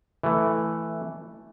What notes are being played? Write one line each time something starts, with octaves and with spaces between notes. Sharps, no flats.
E3 A3